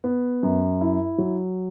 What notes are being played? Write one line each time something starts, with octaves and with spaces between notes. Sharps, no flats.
B3
F#2
E4
F#3